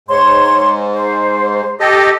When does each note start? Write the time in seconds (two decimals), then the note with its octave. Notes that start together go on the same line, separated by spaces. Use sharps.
0.08 G#2 C#5 C6
0.94 C5
1.80 G4 A4 D#5